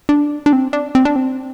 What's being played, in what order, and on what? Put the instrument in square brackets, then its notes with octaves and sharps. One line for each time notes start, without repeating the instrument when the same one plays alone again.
[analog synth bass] D4
D4
C4
D4
C4
D4
C4